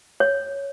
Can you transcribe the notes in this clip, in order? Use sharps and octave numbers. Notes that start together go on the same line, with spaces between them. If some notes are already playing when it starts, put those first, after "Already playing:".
C#5